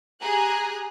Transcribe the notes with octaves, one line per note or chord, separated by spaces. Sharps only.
G4 G#4 G#5 A#5 F#6